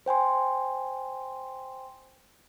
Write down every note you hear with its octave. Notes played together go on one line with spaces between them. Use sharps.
C5 G5 G#5 C6